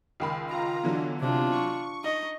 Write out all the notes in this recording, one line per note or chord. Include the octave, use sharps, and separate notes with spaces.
C#2 D#3 B5
F4 A#5
B2 D3 E3 F#3
C3 D4 F4
C#6
D#4 D#5